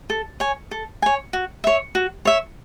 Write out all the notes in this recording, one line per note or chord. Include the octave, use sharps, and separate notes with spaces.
A4
C#5 G#5
A4
C#5 G#5
F#4
C#5 E5
F#4
C#5 E5